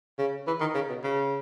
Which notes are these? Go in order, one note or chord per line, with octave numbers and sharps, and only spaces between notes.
C#3
E3
D#3
C#3
B2
C#3